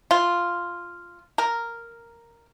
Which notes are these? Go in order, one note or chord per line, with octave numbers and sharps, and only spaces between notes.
F4
A#4